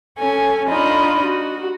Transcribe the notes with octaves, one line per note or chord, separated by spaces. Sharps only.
C#4 A4 G#5
D4 D#4 F4 D#5 B5
F#4